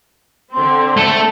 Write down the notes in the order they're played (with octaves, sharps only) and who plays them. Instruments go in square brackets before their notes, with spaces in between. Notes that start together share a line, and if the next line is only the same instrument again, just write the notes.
[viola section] D3 C4 [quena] C6
[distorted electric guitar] A3 A4 [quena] A5